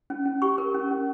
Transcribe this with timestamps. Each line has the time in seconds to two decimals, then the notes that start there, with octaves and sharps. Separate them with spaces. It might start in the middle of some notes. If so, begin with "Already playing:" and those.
0.10 C#4
0.26 C#4
0.42 G4 C#6
0.58 A#4
0.74 C#4
0.91 C#4